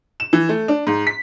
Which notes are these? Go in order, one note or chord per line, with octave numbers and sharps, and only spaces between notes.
E7
E3
A3
D4
G#2
B6